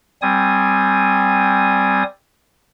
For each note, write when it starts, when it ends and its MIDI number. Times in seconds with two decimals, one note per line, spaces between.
0.22 2.03 55
0.22 2.03 60
0.22 2.03 80
0.22 2.03 87